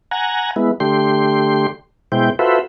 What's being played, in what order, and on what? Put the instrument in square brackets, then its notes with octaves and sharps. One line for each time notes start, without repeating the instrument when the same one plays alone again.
[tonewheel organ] F#5 G#5 A#5
G#3 B3 E4
D3 A3 G4 C6
B2 G#3 E4 C5 G5
F4 F#4 A4 B4 C5 E5